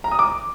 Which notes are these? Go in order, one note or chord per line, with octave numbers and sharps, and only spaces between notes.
A#5
D#6
D6